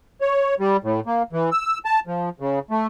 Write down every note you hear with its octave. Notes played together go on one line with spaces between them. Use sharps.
C#5
G3
A2
A#3
E3
E6
A5
F3
C#3
A3